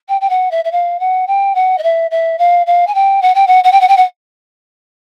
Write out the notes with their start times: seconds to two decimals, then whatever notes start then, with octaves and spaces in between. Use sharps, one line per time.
0.08 G5
0.21 G5
0.30 F#5
0.51 E5
0.64 E5
0.72 F5
1.00 F#5
1.27 G5
1.55 F#5
1.78 D#5
1.83 E5
2.11 E5
2.38 F5
2.66 F5
2.87 G#5
2.95 G5
3.22 F#5
3.35 G5
3.47 F#5
3.64 F#5
3.72 G5
3.81 F#5
3.88 G5
3.97 F#5